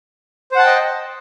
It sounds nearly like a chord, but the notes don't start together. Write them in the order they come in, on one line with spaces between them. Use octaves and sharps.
C5 F#5 A5 G5 D#5